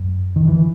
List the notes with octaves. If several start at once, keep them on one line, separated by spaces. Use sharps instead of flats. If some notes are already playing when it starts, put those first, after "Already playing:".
Already playing: F#2
D#3
E3